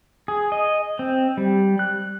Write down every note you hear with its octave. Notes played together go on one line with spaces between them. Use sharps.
G#4
D#5
C4
G3
F#6